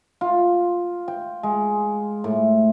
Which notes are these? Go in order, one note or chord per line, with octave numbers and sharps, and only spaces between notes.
F4
G5
G#3
A2